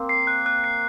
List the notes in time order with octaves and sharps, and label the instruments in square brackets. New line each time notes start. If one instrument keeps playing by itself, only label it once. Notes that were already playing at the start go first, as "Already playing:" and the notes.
Already playing: [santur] A#3 C4
[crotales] C7
F#6
F#6
C7